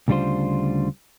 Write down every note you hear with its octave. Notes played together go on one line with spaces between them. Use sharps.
D2 C#3 G3 D4 F4 C5